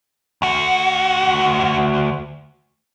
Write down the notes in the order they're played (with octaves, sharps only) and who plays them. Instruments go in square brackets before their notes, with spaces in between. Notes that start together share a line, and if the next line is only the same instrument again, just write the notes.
[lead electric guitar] D2 F#4